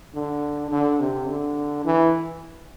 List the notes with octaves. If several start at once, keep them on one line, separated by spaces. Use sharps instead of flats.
D3
D3
C3
D3
E3